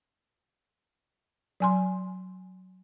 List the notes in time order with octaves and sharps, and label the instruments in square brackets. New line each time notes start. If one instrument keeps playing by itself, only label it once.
[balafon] F#3 G#5 C6